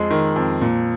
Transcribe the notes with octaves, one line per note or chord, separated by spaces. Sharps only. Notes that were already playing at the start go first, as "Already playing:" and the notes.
Already playing: F2 G#3
D#3
F2
A#2